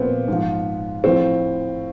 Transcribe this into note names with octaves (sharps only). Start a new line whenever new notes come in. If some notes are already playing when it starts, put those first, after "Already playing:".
Already playing: A#2 F3 B3 C4
G#2 F3
A2 F3 C4